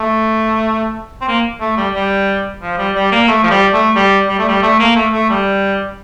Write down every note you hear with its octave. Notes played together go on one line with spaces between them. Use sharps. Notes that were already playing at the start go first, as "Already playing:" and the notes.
Already playing: A3
C4
A#3
A3
G3
G3
F3
G3
G3
A#3
A3
F3
G3
A3
G3
G3
A3
G3
A3
A#3
A3
A3
G3